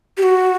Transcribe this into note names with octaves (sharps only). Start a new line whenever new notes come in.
G4
F#4